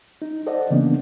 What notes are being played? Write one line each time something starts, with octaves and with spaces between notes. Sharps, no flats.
D#4
A4 C5 D5 D#5 F#5
C#3 E3 A#3 B3 C#4 D4